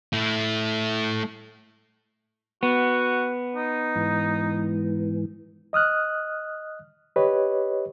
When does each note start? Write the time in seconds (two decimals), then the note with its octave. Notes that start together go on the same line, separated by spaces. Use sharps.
0.13 A3 E4
2.63 B3 F#4
3.56 D#4
3.95 G#2 E3
5.73 D#5 D#6 F6 F#6
7.16 G4 B4 C#5 D#5